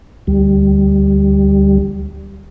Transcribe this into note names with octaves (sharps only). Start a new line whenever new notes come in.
D2 G3